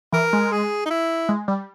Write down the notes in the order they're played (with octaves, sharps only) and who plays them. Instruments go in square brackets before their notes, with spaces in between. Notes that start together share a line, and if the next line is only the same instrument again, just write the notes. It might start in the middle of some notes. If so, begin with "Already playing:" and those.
[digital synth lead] E3 [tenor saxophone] A#4
[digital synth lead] G#3
[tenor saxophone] G#4
D#4
E4
[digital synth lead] G#3
G3